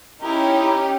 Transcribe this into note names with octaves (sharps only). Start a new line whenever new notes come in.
C#4 D#4 E4 G4 A#4